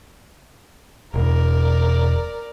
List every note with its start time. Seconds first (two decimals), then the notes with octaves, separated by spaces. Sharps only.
1.14 E1 A#4 D5